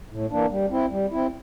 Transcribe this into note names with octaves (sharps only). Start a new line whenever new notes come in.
A2
E3 A#3 D4
G3
C4 E4
G3
C4 E4